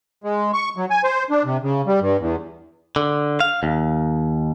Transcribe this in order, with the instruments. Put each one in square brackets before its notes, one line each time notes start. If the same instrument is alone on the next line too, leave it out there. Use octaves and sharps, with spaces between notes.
[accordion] G#3
C#6
F#3
G#5
C5
D4
C3
C#3
G3
G2
E2
[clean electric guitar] D3
F5
D#2